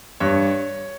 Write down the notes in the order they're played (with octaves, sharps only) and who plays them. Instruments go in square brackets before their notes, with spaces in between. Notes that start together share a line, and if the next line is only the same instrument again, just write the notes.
[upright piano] G2 C#5